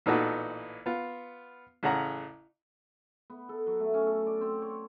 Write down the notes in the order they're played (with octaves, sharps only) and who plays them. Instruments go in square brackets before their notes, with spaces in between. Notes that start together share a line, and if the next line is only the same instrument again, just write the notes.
[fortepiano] A1 A#2 B3 D#4 F#4 A4
B3 F4
A1 C#3 F#5 A#5
[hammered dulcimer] B3
A4
F#3
A3
C#4
A4
D5
C4
C#5